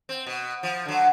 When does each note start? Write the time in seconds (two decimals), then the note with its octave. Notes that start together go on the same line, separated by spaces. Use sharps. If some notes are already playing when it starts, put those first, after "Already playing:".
0.09 C4
0.26 B2
0.63 F3
0.86 D3 F#3